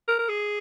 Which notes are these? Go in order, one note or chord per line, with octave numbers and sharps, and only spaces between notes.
A#4
A#4
G#4